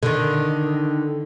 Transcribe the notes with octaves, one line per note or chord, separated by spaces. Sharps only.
D3 D#3